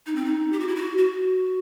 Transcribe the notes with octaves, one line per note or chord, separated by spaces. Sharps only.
D#4
C4
D#4
G4
F#4
E4
F#4
F#4